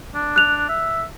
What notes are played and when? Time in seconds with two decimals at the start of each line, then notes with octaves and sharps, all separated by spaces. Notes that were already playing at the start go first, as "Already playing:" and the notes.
0.15 D4
0.36 F#6 F7
0.69 E5